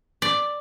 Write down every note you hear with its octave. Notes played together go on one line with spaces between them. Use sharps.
D5